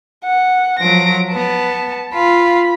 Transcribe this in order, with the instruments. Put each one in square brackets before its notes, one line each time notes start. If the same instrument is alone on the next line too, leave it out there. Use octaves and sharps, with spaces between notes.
[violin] F#5
[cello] F3 F#3 [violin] A#6 D7
[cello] B3 [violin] A5
[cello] F4 [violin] B5